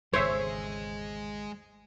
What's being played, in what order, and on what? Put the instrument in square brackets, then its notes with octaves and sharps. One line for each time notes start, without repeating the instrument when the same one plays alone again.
[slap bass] G#1 E2 C#3 [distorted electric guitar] G#3 G#4 [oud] C5 [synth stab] C#5 E5